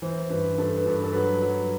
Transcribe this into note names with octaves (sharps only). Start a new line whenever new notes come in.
E3 C5
C5
G2 B4
G2 A4
B4
G2
B4
A4
F#3 B4
F#3